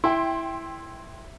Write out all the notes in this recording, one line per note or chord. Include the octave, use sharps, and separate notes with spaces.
E4 G5 C6